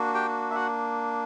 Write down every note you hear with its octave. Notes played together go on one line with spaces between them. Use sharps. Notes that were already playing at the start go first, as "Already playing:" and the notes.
Already playing: A#3 D4 F#4
G4 G5
E5
F#4 F#5